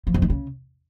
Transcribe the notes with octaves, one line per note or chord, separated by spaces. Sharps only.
F3
F2
D#3
C#3